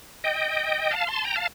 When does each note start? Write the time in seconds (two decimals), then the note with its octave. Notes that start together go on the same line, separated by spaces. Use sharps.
0.24 D#5 G5
0.91 F5 A5
1.07 A5 C6
1.24 G5 A#5
1.36 F5 A5